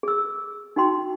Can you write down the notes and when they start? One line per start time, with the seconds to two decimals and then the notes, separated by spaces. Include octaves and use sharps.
0.03 G#4 E6
0.76 D#4 F#4 G5 C6